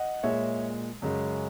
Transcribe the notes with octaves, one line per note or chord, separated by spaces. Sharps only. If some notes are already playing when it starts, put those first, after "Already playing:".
Already playing: D#5 F#5
A#2 G#3 C#5 E5
F#2 C#3 G#3